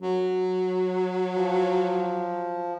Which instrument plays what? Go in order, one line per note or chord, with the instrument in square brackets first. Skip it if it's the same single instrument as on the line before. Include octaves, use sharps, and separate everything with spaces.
[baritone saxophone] F#3
[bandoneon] F3